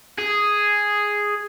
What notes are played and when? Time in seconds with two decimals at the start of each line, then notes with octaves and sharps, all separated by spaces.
0.18 G#4